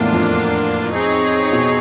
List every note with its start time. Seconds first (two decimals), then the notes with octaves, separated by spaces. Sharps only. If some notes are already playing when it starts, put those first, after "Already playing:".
Already playing: E2 A2 A#3 D4 F4
0.12 F2
0.92 C4 D#4 G#4 C#5
1.52 B2